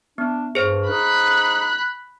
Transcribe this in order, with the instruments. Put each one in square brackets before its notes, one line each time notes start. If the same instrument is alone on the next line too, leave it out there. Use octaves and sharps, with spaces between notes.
[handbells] B3 [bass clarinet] D4
[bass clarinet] G2 [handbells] G#4 C5
[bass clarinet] D#4 [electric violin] B5 F#6